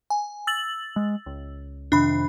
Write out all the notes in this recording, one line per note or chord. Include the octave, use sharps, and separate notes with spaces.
G#5
E6 A6 F#7
G#3
C#2
F2 C3 D#3 D4 B5